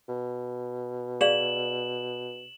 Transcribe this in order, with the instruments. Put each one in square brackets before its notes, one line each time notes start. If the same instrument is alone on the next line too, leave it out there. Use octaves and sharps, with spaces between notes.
[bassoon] B2
[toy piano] G#4 D5 F5 [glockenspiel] E7 F#7